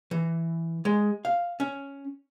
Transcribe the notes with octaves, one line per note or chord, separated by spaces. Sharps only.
E3
G#3
F5
C#4